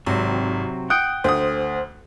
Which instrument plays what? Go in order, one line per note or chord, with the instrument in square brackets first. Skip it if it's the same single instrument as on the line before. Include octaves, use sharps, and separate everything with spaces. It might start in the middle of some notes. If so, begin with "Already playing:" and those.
[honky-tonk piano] G#1 [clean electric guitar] C3 F#3 C4
[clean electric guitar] F#5 G5 [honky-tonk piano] D#6
[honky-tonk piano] D2 D#6 [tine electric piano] C5